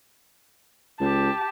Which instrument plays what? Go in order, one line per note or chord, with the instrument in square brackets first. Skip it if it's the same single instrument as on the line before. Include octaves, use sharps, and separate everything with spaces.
[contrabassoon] C#2 [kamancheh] G4 A5